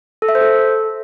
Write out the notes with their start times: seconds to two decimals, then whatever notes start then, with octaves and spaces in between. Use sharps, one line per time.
0.22 A4
0.29 E5
0.35 C5
0.41 A4